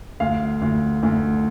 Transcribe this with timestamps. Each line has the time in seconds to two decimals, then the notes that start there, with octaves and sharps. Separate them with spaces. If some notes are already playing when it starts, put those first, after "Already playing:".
0.20 D2 F5
0.62 D2
1.03 D2